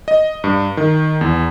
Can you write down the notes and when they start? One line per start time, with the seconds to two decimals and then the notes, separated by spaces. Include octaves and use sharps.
0.08 D#5
0.44 G2
0.77 D#3
1.21 E2